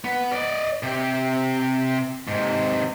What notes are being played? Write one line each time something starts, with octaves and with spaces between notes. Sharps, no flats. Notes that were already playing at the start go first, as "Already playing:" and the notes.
B3
D5 D#5
C3 G4
G#2 C3